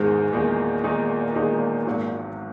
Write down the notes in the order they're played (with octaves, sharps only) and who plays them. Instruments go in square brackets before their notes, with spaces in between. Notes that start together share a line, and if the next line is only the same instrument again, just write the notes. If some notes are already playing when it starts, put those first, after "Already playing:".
Already playing: [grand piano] E1 E2 D#3 G#3 D#4 [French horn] G#2
[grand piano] E1 E2 D#3 G#3 D#4 [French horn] A#2
[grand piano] E1 E2 D#3 G#3 D#4
E1 E2 D#3 G#3 D#4
G#1 G#2 F#3 A#3